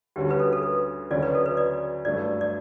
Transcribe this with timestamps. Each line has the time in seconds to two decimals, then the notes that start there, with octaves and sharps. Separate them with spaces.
0.16 D2 D3 G3 C#4 F#4 G4
0.31 B4
0.39 A4
0.53 A4
0.63 B4
1.10 D2 C#3 F#3 C#4 D5
1.23 B4
1.35 A4
1.46 B4
1.57 D5
2.05 G2 F#3 A3 D5
2.41 D5